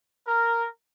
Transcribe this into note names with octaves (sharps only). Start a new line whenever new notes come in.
A#4